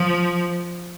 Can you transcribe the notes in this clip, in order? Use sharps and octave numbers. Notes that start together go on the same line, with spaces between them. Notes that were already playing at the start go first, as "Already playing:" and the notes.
Already playing: F3